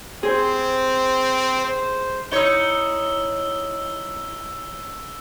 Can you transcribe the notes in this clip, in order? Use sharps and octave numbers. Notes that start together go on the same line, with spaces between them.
C4 G#4 C5
C5
D#4 E4 C#5 E6 G7